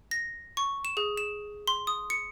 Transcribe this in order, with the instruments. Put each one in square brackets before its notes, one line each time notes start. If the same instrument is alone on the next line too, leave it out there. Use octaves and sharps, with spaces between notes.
[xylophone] A#6
C#6
E7
G#4
E7
C6
D#6
C#7